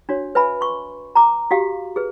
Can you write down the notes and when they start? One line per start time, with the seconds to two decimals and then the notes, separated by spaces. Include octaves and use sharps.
0.09 D4 F#4 C#5
0.35 B4 E5 G#5 B5
0.61 C6 C#6
1.15 A#5 D6
1.51 F#4 G4 F5
1.96 G#4 B4